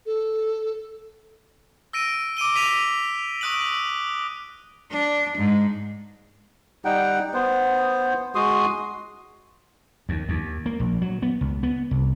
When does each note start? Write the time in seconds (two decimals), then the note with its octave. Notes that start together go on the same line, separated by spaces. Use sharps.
0.06 A4
1.93 E6 A#6 D7 D#7
2.37 D6 D7 D#7 G7
2.56 B6 D#7 F7
3.41 C#6 D#6 F#6 D7 F#7
4.91 D4
5.37 G#2
6.85 G3 D#4 F#5 G5
7.34 B3 C5
8.35 G#3 F#4 C6 D#6
10.09 D#2
10.29 D#2
10.66 A#3
10.80 A#1
11.02 F#3
11.22 B3
11.41 C#2
11.63 B3
11.91 C2